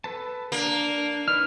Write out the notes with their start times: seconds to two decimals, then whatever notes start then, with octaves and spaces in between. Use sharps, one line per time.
0.04 A4 B4 A5
0.52 A#3 D4
1.28 D4 D#4 B4 F6